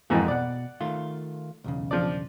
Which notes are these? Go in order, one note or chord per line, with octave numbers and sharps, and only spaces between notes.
F2 G#2 E3 A#3 F#4
B2 D5 F#5
D#3 A3 F4
B1 E2 C#3
F3 D4 D5